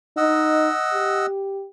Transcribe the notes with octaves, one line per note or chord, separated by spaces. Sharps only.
D#4 D#5 F#5 E6
G4